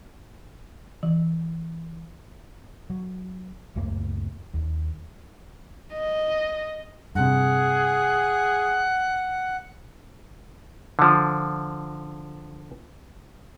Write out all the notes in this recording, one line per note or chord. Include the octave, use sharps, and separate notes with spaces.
E3
F#3
C#2 F#2 A3 A#3
D#2
D#5
G2 C3 G#4 F#5
D3 F3